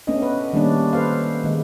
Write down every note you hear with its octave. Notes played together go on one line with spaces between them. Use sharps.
A3 B3 C#4 D4 D#5
B4
D#3 G3 A3 A#3 C#4 D4
A4 B4 C5 F5
D#3 G#3